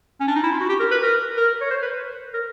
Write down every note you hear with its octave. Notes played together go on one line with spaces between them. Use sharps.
C#4
D4
D#4
E4
F4
F#4
G4
A#4
B4
A#4
A#4
C#5
C5
B4
A#4